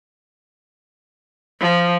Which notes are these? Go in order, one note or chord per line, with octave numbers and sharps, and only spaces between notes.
F3